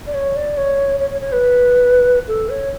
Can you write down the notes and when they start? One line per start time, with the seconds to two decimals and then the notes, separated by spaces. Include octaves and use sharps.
0.06 D5
0.13 C#5
0.35 D5
0.57 C#5
0.99 C#5
1.09 C#5
1.21 C#5
1.32 B4
2.28 A4
2.49 C#5